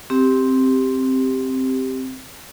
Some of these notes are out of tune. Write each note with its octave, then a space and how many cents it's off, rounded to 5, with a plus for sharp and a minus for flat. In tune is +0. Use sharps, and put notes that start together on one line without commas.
C4 +0 G4 +0